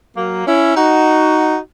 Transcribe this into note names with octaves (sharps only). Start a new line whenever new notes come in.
F#3 A#3
C#4 E4
D#4 F#4